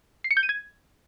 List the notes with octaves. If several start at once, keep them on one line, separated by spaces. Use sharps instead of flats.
C7
C#7
G6
D#7
G#6